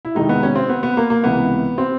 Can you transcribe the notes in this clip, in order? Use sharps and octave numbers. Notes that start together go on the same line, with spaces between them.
E4
F2 C3 D#3 G#3 D#4
B3
C#4
C4
B3
B3
A#3
A#3
C#2 C3 E3 B3
C4